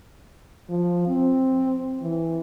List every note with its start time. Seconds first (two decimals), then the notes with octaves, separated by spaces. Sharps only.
0.70 F3
1.07 C4
2.02 E3